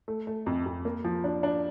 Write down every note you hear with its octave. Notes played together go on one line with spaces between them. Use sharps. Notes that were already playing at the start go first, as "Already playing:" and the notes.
A3
A3
F2
F2
A#3
F3
D4
D4